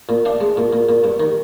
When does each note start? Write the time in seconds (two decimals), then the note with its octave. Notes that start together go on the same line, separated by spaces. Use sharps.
0.09 A#2
0.25 D4 F5
0.40 G#3
0.57 A#2
0.73 A#2
0.89 A#2
1.04 G2
1.20 D#3